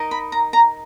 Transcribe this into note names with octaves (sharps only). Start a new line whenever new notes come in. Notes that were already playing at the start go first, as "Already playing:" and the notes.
Already playing: D#4 A#4 D#5
B5
A#5
A#5